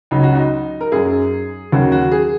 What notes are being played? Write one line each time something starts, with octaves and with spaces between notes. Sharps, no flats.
C#2 C#3 F#3 D#4
F#4
D#4
A#4
F#2 F#3 G#4
D#2 C#3 F#3 F#4
F#4
G#4